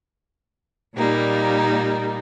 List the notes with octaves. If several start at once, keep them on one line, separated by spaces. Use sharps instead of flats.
A#2 G3 A#3 D#4